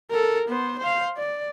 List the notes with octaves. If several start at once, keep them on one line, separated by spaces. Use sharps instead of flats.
A4 A#4
B3 C5
C5 F5
D5